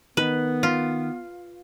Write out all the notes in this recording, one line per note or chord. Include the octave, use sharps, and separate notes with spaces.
D#3 B3 B4
F4